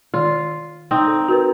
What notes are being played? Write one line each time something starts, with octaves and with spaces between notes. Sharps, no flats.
D#3 F4 D5 C6
C4 D#4
A4
F#4 A#4 B4